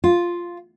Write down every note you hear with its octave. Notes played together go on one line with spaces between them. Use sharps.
F4